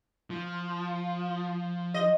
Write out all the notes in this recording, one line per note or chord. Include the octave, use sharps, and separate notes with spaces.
F3
D#5